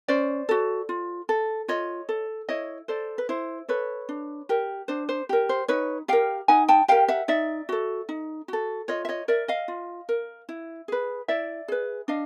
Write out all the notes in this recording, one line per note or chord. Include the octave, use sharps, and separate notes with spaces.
C#4 C5 D5
F#4 A4
F4
A4
F4 C#5 D#5
A4
E4 C#5 D#5
A4 C5 D5
B4
E4 C5
A4 B4 C#5
D4
G4 A#4
D4 C5
C5
G4 A#4
C5
D#4 B4 C#5
G4 A#4 F5 G5
D#4 F#5 G#5
G5 A5
G4 A#4 F5 G5
E5 F#5
D#4 D5 E5
F#4 A4
D#4
F#4 A4
F4 C#5 D#5
E5
C#5 D#5
A#4 D5 E5
D#5 F5
F4
A#4
E4
G#4 B4
E4 D5 E5
G#4 B4
D4 D#5 F5